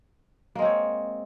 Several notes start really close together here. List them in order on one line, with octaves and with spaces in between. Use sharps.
A#3 G#3 C4 C#5